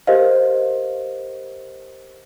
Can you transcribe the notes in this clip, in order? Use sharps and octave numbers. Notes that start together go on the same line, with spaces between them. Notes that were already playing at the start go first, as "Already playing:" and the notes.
G4 A#4 C5 D#5 F5